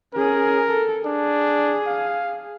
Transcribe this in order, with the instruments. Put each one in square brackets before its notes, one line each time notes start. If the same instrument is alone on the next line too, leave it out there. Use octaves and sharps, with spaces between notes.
[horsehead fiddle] C#4 G#4 [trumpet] A#4
[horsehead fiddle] A4
[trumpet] D4 [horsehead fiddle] G#4
[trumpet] F5